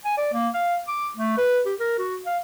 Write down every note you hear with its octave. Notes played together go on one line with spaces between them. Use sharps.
G#5
D5
A#3
F5
D6
A3
B4
G4
A#4
F#4
F5